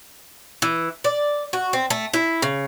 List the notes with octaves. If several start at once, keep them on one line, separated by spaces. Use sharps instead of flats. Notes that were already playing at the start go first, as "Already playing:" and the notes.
E3
D5
F#4
C4
A3
E4
C#3